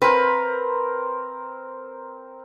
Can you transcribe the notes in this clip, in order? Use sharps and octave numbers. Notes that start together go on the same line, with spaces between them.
C4 A#4 B4